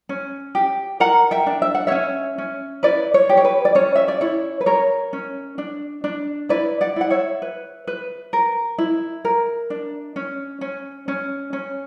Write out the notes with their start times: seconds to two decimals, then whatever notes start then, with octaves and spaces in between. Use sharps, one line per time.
0.09 C#4
0.55 G4
1.00 A#4 F#5 A#5
1.31 E5 G5
1.47 D4
1.62 E5
1.75 F#5
1.87 C#4 C#5 E5
2.38 C#4
2.83 E4 B4 D5
3.14 C#5
3.29 G4
3.37 C#5
3.45 B4
3.65 D5
3.75 C#4 C#5
3.95 E5
4.08 D5
4.21 E4 C#5
4.61 B4
4.66 A#4 C#5
5.13 C#4
5.58 D4
6.04 D4
6.49 E4 B4 D5
6.81 D5 F#5
6.96 E4 F#5
7.11 C#5 E5
7.42 B4
7.87 B4
8.33 A#4
8.78 E4
9.25 A#4
9.70 D4
10.16 C#4
10.61 C#4
11.08 C#4
11.53 C#4